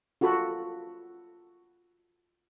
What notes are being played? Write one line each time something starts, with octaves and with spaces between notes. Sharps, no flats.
F4 F#4 A4 B5